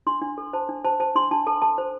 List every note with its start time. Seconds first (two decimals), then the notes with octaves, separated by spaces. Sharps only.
0.07 D4 C6
0.22 D4
0.38 A4
0.53 C5 A5
0.69 D4
0.85 C5 A5
1.00 C5 A5
1.16 D4 C6
1.31 D4 A5
1.47 A4 A5
1.62 A4 A5
1.78 C5